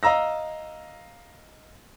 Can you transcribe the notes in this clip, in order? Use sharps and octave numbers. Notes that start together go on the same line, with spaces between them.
D#5 F5 A#5 E6 A#6